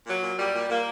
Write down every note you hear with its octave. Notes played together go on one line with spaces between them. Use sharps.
A#2 F#3
A#2
A#2 G3
A#2
A#2 A#3